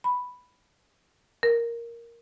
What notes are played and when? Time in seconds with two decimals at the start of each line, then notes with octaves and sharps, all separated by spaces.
0.04 B5
1.43 A#4